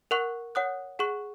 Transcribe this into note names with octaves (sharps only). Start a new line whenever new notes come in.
A#4 F#5 C#6 F#6
C#5 F#5 D#6 F#6
G#4 F#5 C#6 F#6